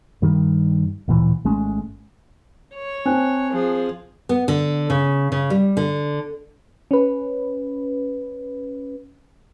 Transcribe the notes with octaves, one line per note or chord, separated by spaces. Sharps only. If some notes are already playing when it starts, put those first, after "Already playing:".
G2 D#3 G3
D1 A#2 E3
G#1 G#3 A3 C#4
C#5
C4 G#5 A5 F#6
F3 G#4
B3
D3
C#3
C#3
G3
D3
C#4 B4